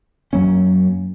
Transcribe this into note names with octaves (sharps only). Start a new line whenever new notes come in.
F#2 F#3 A#3 C#4